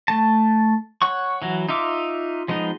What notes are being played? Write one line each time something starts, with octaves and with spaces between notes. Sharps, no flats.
A3 A5
C#5 F#5 C#6
E3 F#3 F#4
D#4 F4 E5 D6
F3 G#3 B3 D#4